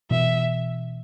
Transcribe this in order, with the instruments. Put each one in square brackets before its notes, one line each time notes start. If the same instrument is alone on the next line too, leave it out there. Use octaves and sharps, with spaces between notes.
[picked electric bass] B2 E3 [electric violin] E5